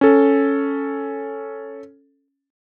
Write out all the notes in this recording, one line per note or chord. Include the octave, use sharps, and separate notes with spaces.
C#4 A4